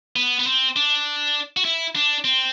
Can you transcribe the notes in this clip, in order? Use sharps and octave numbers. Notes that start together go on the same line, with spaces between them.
B3
B3
C4
D4
F#4
E4
D4
C4